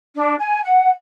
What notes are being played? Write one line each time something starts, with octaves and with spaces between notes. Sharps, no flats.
D4
G#5
F#5